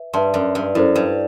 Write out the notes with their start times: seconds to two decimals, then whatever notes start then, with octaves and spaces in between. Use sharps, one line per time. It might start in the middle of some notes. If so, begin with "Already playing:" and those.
Already playing: B4 E5
0.13 G2 B4 E5 A5 C6
0.34 F#2
0.55 G2
0.75 F#2 E4 A4 C5
0.95 G2